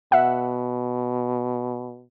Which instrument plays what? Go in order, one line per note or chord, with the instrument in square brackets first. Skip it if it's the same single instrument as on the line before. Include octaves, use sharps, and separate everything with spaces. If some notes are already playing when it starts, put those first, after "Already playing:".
[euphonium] B2 [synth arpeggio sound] E5 F#5